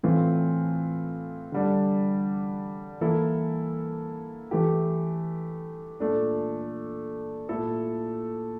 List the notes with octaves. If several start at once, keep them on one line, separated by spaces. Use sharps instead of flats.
A2 E3 A3 C4 F4
D3 G3 D4
E3 A#3 E4 A4
E3 A3 E4 G4
A#2 A3 D4
A#2 A3 E4 A4